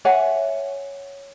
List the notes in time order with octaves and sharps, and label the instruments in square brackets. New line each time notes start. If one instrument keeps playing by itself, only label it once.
[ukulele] C#5 E5 F#5 G#5